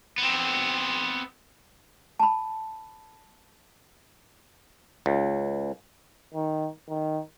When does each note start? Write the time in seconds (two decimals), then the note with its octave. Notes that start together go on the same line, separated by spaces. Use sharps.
0.18 B3 C4
2.20 A5 B5
5.06 C#2
6.34 D#3
6.89 D#3